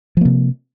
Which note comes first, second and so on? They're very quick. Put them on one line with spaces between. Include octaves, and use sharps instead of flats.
F3 A#3 C3